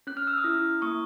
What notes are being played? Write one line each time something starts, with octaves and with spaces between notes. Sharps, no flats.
C#4 F#6
F6
E6
D#6 F6
E4
A#3 C#6 D#6